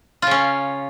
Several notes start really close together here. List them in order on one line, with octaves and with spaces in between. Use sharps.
F4 C#3 C#4